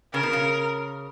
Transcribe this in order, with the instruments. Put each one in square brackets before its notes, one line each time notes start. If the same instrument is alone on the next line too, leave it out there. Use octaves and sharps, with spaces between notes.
[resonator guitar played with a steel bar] C#3 [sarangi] A#4
[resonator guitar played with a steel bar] B2
C#3